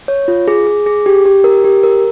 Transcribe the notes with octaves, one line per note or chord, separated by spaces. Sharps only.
C#5
F4
G#4
G#4
G#4
G4
G4
A#4
G4
A#4